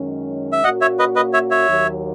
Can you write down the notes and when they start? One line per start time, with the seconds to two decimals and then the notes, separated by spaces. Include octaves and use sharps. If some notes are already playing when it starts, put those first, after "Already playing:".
Already playing: F#2 D#3 G#3 C#4
0.52 E5
0.64 A#2 A#3 C#4 F#4 D#5 F#5
0.81 C#5 E5
0.99 B4 D#5
1.16 B4 D#5
1.33 C#5 E5
1.51 C#5 E5
1.68 D#2 D#3 F#3